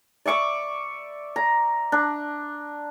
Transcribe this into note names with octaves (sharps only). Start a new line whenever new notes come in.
D5 E5 C#6 D6
A#5
D4